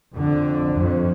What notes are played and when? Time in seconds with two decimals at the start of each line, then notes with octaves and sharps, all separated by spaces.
0.15 F2 D3
0.73 F2